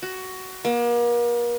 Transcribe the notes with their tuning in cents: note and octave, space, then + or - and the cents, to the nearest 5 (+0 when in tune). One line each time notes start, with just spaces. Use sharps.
F#4 +15
A#3 +40